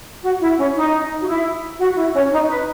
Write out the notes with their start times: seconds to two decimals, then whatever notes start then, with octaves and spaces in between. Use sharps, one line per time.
0.23 F#4
0.41 E4
0.57 C#4
0.76 D#4
1.22 F#4
1.27 E4
1.79 F#4
1.97 E4
2.14 C#4
2.31 D#4
2.49 B4